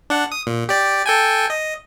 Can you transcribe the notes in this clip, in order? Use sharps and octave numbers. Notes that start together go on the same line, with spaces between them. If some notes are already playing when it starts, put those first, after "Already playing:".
D4 F#5
D#6
A#2
G4 D5
A4 G5 G#5
D#5